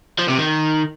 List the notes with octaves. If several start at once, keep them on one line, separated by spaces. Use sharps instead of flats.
F3
C3
D#3